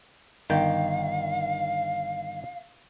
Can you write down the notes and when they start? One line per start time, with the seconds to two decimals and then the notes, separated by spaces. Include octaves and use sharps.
0.50 G1 D#3 F5 G5